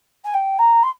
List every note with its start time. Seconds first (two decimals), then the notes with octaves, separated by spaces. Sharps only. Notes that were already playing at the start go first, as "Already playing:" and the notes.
0.24 G#5
0.34 G5
0.58 A#5
0.83 C6